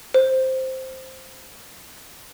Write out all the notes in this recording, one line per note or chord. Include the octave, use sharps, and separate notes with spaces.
C5